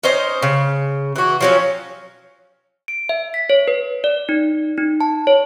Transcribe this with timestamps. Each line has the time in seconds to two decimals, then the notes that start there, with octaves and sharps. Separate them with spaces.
0.03 C#4 D#4 C5 D#5
0.42 C#3
1.16 E3 F#4
1.41 F3 F#3 C#4
2.88 D7
3.09 E5
3.34 B6
3.50 C#5
3.68 B4
4.04 D5
4.29 D#4
4.78 D#4
5.01 A5
5.27 C#5